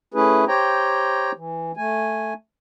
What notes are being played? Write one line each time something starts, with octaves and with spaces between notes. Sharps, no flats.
A3 C#4 E4 G#4 B4
G4 C5 C#5 G5 A#5
E3
A3 G#5